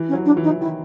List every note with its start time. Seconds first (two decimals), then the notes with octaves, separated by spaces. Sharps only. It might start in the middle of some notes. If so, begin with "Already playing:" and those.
Already playing: E3
0.08 C#4
0.13 F#3
0.25 D4
0.37 E3
0.43 D#4
0.51 E3
0.61 D#3 E4